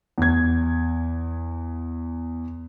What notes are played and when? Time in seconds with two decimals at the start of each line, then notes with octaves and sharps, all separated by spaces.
0.18 E2 G#6